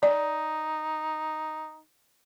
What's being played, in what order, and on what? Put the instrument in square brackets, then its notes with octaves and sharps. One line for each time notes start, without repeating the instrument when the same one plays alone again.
[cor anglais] D#4 [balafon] D5